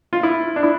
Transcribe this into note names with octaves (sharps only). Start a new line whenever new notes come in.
F4
E4
D4
E4